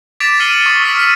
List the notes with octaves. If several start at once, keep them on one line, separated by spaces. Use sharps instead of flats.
D6 A6 B6 D7 E7 F7
F6 C7 C#7 D#7 F#7 G7
C#7
C#6 D#6
E6 F6 B6
C#6 E6 F6 B6 D#7